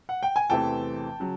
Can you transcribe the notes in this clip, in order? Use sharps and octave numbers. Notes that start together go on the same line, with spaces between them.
F#5
G5
G#5
E2 C3 E3 A3 C4 G5 A5
C#3 F#3